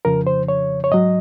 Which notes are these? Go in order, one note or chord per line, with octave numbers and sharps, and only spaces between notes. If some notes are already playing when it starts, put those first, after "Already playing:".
F2 C#3 F3 A#4
C5
C#5
C#5
G#2 F#3 D#5